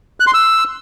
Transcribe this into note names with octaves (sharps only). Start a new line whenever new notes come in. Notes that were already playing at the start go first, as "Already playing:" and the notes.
F#6
C6
E6